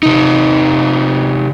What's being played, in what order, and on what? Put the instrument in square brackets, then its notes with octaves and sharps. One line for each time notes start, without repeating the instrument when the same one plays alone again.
[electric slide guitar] C3 D#4